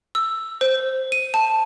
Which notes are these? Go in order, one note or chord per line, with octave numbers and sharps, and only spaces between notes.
E6
C5
D#7
A5